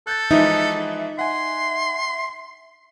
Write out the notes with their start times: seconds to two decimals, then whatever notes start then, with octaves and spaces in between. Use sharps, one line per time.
0.07 A4 F#6 G6 A6
0.31 E3 F3 G#3 D#4 E5
1.19 F#5 G#5 C6